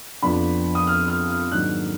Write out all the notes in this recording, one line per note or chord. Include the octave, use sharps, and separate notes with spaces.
F2 F3 B3 D4 B5
D#6
F6
F6
F6
G#2 D#3 F#3 A#3 D4 F#6